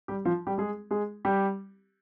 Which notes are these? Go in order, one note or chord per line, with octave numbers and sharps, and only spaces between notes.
G3 G4
F3 F4
G3 G4
G#3 G#4
G#3 G#4
G3 G4